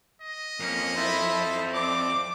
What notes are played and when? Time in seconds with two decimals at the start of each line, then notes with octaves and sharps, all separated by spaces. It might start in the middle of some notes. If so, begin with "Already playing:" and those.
0.21 D#5
0.60 F2 A#3 C#4
0.96 E4 A4 C5 B5
1.74 C4 D5 D6